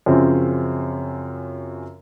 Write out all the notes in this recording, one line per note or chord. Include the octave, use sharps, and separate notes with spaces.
F#2 C#3 F3 C4 C#4